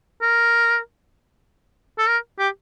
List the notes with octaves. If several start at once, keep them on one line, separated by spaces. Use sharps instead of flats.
A#4
A4
A#4
G4